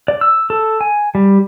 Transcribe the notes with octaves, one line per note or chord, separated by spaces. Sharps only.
D5
E6
A4
G#5
G3